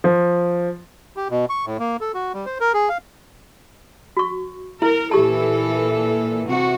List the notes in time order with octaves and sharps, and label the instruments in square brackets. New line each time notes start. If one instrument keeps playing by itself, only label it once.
[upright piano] F3
[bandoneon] G4
B2
C#6
A2
A#3
A4
F#4
G3
C5
A#4
G#4
F5
[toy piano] F#4 C#6
[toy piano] E4 [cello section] A#4
[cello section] A#2 E3 A4 [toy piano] G4 A5
[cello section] C3 F#4